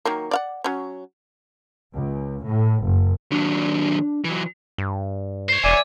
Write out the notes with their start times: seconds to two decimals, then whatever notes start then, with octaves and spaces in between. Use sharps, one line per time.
0.05 D#3 F#3 A#3
0.31 D5 F5 F#5
0.64 F#3 C#4
1.95 C#2
2.45 A2
2.85 F#1
3.31 D#2 F#3 D4
4.24 E3 F#3
4.78 G2
5.49 C5 C#5
5.64 E1 D5 E5 G#5